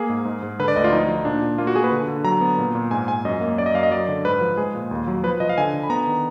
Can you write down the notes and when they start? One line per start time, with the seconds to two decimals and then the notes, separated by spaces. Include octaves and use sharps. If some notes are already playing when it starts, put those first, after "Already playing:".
Already playing: A#3 G#4
0.09 G#2
0.25 G#2
0.43 G#2
0.59 D3 B4
0.68 D5
0.76 D2 D#5
0.84 F4
0.93 F3 D#4
1.08 F3
1.25 A#2 D4
1.42 A#2
1.58 A#3 F4
1.67 F#4
1.76 A#3 G#4
1.84 B4
1.92 D3
2.08 D3
2.25 F#3 A#5
2.41 B3
2.58 A#2
2.75 A#2
2.91 G#2 G#5
3.08 G#2 G#5
3.25 F#2 D#5
3.41 A#3
3.58 F#2 D5
3.66 D#5
3.74 F#2 F5
3.83 D#5
3.91 F#3 D5
4.08 D3
4.25 G#2 B4
4.41 F3
4.57 G#3 G#4
4.75 A#2
4.91 D#2
5.07 F#3
5.23 F3 B4
5.40 F3 D#5
5.49 F5
5.58 D3 G#5
5.74 D3
5.83 B5
5.90 B3 A#5
6.07 D#3